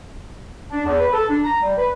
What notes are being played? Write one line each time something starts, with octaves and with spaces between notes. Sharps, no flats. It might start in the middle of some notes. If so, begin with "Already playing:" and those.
D4
E2
B4
A4
D4
A#5
G3
B4